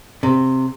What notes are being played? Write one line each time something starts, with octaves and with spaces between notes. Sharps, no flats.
C3